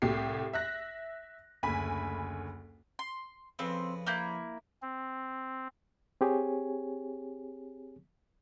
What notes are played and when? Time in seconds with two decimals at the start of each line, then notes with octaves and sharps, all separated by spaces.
0.02 C2 A2 G4 C7
0.53 E5 F#6 A#6
1.63 F#1 D2 G#5 B5 B6
2.99 C6
3.59 F2 C#3 C4 B4
4.07 A#3 E4 G6
4.82 C4
6.21 C4 G4 G#4 C#5 G#5